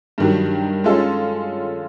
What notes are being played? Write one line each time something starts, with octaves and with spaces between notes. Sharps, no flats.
G2 D#3 F#3
G#3 C#4 F4 A4